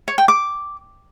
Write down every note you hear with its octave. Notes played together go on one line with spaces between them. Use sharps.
C#5
G5
D6